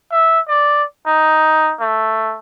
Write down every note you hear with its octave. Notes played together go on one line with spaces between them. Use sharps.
E5
D5
D#4
A3